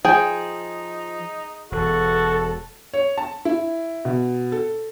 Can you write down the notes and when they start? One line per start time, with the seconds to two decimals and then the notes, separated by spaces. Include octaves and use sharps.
0.05 F3 D#4 G#4 G5
1.72 E1 F#4 A4
2.93 C#5
3.18 A5
3.45 E4
4.05 B2
4.52 A4